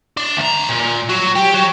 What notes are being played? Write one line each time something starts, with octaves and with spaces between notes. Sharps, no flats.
D4
D2 A#5
A#2
F#3
G4
F#3